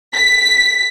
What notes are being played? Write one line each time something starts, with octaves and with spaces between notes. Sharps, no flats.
B6